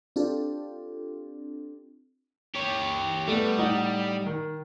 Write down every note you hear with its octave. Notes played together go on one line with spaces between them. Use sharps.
C4 D4 F4 G4 A4
G4 C#5
G3 A3 B3
A2 D#4 F#5
D#3